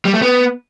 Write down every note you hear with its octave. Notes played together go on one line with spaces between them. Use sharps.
G3
A3
B3